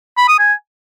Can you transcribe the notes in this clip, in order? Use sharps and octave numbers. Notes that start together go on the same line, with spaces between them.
B5
D#6
G#5